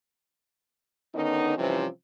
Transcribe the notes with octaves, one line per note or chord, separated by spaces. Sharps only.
D3 D#3 B3 C#4 D#4
C3 E3 F3 G3 C4 C#4